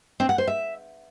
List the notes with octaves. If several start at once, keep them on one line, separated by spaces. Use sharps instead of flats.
C4
F#5
C5
E5